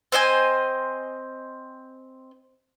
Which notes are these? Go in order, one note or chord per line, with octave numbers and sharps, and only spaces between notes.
C4 C5 D#5 G#5